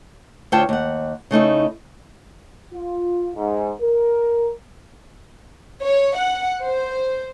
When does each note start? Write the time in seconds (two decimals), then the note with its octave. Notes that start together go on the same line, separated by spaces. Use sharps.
0.52 D2 F4 C5 C#5 G5 A5
0.69 D#2 F#5
1.31 C#3 A3 D#4 E4
2.73 F4
3.36 G#2
3.80 A#4
5.83 C#5
6.16 F#5
6.62 C5